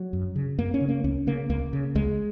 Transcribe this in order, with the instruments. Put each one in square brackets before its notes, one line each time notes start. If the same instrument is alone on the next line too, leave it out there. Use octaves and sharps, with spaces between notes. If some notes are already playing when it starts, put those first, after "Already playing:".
Already playing: [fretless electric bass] F#3
F#2
C#3
F#2 A#3
C#4
C#3
A#3
C#2 C#4
C#3 A#3
C#2 A#3
C#3
C#2 G#3